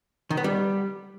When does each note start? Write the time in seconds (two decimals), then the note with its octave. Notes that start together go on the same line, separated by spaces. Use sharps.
0.30 D#3
0.37 B3
0.44 G3